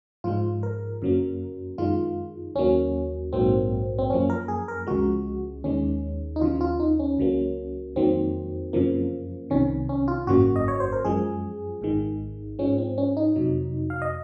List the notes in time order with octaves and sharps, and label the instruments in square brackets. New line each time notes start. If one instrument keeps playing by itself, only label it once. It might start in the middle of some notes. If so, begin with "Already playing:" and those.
[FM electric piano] G#2 F3 G#3 F4
A#4
F#2 C#3 F#3 A#3
F#2 D#3 G#3 F4
D#2 C#3 F#3 A#3 C#4
A#1 G#2 F#3 A#3 C4
C4
F#2 F3 A#3 C#4
A#4
G#4
A#4
C#2 C#3 F3 G#3 F#4
D#2 D#3 G#3 C#4
D#4
D#2 C#3 F3 F4
F4
D#4
C#4
C#2 C#3 F#3 A#3
F2 D#3 F#3 A#3 C4
F#2 C#3 F3 A#3
C2 C3 D#3 C#4
C#4
F4
G#1 F#2 C#3 F#3 A#3 F#4
D#5
C#5
C5
A#4
F#2 F3 G#3 G#4
G#1 G#2 D#3 G#3
G#2 F3 G#3 C#4
C4
C#4
D#4
F2 C3 F#3
F5
D#5